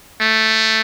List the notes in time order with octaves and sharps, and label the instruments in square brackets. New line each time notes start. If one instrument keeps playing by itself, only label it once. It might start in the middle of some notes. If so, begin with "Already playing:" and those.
[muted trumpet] A3